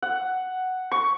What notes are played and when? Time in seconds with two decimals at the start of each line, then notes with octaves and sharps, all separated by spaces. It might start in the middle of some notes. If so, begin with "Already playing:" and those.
0.02 F#5
0.91 C#6